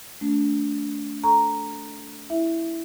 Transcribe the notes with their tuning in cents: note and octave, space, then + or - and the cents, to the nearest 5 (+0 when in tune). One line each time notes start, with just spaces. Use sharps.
A3 -10 D4 -30
A4 +0 A#5 +0 C#6 +0
E4 +0 E5 +0